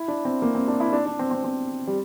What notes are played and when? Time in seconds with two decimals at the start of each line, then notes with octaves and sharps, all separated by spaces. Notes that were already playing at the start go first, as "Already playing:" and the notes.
Already playing: E4
0.08 D4
0.25 C4
0.42 A#3
0.55 C4
0.68 D4
0.80 E4
0.93 D4
1.06 D4
1.19 C4
1.31 C4
1.44 C4
1.87 G3